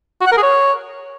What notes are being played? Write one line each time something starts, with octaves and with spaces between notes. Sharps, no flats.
F#4
F#5
A#4
G#4
C#5